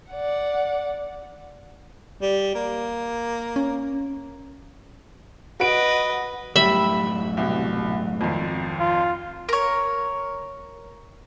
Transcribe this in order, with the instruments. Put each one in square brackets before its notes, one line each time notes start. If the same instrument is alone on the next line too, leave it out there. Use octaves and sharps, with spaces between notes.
[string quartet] D5 F#5
[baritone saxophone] G3
A#3
[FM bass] C#4
[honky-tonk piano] F#4 D7 [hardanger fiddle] B4 D#5
[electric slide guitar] F#2 A2 [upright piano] G3 [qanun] E5 B5
[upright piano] C2 B2
G#1 F2
[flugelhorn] F4
[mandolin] A#4 C#5